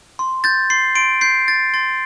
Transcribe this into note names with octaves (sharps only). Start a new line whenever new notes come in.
C6
G6 A6
C6 C7
C6 D7
G6 C7
G6 A6
C6 A6